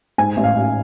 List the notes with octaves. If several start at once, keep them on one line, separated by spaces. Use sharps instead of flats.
G#2 G#5
A1
F5
A1